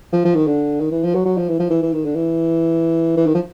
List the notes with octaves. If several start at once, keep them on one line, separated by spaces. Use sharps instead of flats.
F3
F3
D#3
D3
D#3
E3
F3
F#3
F#3
F3
E3
F3
E3
E3
D#3
D3
E3
E3
D#3
F3